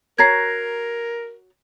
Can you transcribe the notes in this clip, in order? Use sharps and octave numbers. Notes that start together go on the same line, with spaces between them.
F#4 A#4 C#5 A#5 G#6 A#6 C7